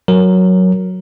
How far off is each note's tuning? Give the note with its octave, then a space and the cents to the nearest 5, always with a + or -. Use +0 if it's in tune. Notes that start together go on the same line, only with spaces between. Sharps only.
F#3 +0 A#4 +0